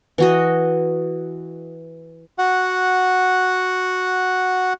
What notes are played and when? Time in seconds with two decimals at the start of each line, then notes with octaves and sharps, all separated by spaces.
0.18 E3 F#4 D#5
2.39 F#4 F#5